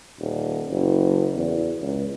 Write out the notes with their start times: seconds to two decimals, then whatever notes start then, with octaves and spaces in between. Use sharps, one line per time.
0.19 D#1
0.70 F#1
1.36 E2
1.81 C#2